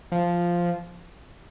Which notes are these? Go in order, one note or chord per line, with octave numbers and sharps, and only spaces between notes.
F3